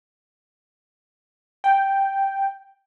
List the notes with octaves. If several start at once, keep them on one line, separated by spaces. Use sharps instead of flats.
G5